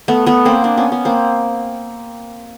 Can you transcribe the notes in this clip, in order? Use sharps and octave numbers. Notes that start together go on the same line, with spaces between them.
A3 B3
A3 B3
A#3 C4
C4 D4
B3 C#4
B3 C#4
A#3 C4